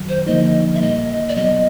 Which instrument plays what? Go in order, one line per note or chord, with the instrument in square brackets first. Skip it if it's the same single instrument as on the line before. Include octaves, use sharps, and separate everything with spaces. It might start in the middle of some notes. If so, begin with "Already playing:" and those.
Already playing: [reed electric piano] F#2 D#3 F#3
[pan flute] C5
[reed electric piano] D3 F3 A#3 D#4 [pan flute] D#5
[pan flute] E5
[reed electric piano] A#2 G3 A#3 [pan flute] D#5
[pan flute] D5
[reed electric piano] B2 F#3 B3 [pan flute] D#5